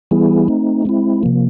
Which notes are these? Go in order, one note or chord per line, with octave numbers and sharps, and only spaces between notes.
E3 G3 B3 E4 G#4
A3 C4 D#4
G#3 C4 E4
C3 F3 A#3